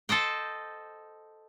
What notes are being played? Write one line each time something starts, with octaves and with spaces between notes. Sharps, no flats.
A4 C5 D#5 G5